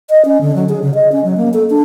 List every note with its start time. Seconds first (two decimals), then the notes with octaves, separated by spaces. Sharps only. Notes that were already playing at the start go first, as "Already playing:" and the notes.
0.10 D#5
0.25 C#4
0.41 D3
0.55 F#3
0.69 G#4
0.82 C#3
0.95 D#5
1.12 C#4
1.24 F#3
1.37 A#3
1.54 A4
1.70 D4